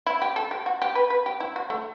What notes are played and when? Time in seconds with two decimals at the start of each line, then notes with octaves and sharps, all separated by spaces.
0.06 E4
0.22 G4
0.36 A4
0.51 G4
0.66 F#4
0.82 G4
0.95 B4
1.10 B4
1.26 G4
1.40 E4
1.56 F#4
1.70 A3